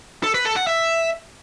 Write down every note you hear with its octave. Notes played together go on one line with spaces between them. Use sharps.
A4
B4
A4
F#5
E5